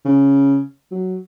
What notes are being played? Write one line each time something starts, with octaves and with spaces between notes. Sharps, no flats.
C#3
F#3